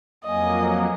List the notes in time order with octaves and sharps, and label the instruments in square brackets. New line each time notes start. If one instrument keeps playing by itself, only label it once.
[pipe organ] F2 F#3 A#3 [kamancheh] D#5 G#5